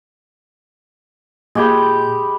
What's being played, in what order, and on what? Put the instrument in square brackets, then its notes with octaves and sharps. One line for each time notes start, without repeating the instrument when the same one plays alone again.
[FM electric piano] A#2 G6 [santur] G#3 G4 B5